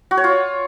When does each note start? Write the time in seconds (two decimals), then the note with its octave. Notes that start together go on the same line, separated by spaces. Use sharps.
0.11 F#4
0.17 C#5
0.24 F4